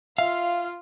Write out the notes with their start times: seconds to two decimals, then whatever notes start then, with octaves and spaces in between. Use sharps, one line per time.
0.18 F4 E5 F5